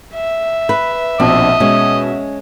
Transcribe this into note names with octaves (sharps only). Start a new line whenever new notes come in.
E5
B4
A#1 B2 C4 D4 D#5
B2 G#3 C#4